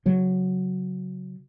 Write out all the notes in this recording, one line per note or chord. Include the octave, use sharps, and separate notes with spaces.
C#3 F#3